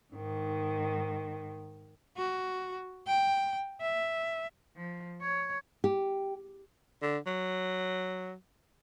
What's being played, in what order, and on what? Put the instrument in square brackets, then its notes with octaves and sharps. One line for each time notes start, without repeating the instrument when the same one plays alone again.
[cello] G#2 D#3
F#4
G5
E5
F3
C#5
[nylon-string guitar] G4
[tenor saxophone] D3
F#3